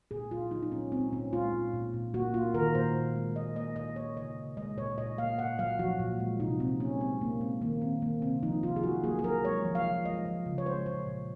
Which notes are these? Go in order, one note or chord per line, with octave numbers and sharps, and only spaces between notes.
A#2 G#4
F#3 F4
F#3 D#4
D#4
A#2 C#4
G#3 C4
A#2 C#4
G#3 F4
A#2
A#2
A#2
A#3 F#4
A#3 F4
D#3 A#4
A#2 C5
A#2
G#3
A#2 D#5
A#3 D#5
A#2 D#5
A#3 C#5
C#3 D#5
C#3
G#3 D#5
A#2 C#5
A#2 D#5
A#3 F5
A#2 F#5
F#3 F5
F3 F#4
A#2
G#3
C3 D#4
C3 C4
A#3 C#4
G#3 C4
A#2 A#3
G#3 C4
D#3 A#3
D#3 C4
D#3 A#3
C3 C4
F3 D#4
C3 F4
G#4
F#3 F#4
A#3 G#4
G#4
F#3 A#4
G#3 C#5
F3
F5
F3
G#3 D#5
F3
C#3
C#5
G#3 C5
A#2 C#5
A#2